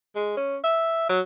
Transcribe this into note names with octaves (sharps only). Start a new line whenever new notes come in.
G#3
C#4
E5
F#3